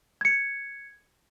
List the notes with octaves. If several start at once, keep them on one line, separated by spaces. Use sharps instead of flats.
G#6 C#7